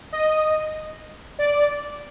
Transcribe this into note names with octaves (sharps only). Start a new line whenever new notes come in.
D#5
D5